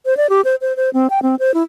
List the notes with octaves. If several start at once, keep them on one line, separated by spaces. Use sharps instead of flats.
C5
D5
G4
C5
C5
C5
C4
G5
C4
C5
E4